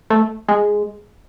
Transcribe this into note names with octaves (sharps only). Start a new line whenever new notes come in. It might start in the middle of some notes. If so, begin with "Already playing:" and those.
A3
G#3